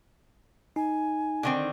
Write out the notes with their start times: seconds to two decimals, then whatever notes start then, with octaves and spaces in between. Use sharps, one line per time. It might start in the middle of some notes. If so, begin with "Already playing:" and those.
0.76 D#4 G#5
1.43 D3 D#3 C4